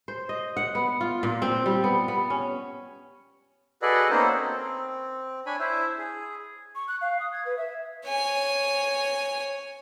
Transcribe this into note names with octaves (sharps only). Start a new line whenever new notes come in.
C5
D#5
F#5
B3
F4
A#2
C4
G3
B3
B3
C#4
F#4 G#4 A4 B4 D5 D#5
A#3 B3 C#4 D#4 A4 C5
C4
D4 C#5 G#5 B5
E4 C5 E5
G#4
C#6
F#6
F5
D#6
G#6
B4
E5
C#5 G#5